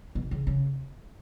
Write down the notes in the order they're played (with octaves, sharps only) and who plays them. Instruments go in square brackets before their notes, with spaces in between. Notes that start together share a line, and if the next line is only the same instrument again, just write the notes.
[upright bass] B2
C#3
C#3